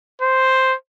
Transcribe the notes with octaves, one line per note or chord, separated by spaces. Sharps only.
C5